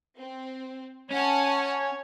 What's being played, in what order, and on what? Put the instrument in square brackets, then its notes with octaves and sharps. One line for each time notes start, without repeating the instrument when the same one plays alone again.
[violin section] C4
[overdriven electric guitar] C#4 [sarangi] C#5 [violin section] F#5 G#5 A5